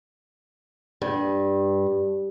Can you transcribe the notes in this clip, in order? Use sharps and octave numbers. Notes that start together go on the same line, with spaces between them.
G2